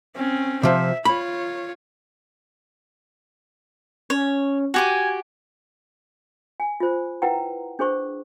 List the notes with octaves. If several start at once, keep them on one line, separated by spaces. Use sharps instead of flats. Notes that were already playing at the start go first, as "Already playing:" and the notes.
C4 C#4
C3 F3 E5
F4 C#5 B5
C#4 C#5
F#4 G4 G#5 D6
G#5
F4 C5
E4 B4 F#5 G5 A#5
D4 G#4 C5 C#6